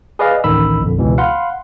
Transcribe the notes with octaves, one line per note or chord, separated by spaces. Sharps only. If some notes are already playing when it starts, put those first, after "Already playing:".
G#4 B4 D5 D#5 F5
A1 D2 D#3 B5 E6
A#1 F2 D3
C#2 B2 E3
F5 F#5 B5 C6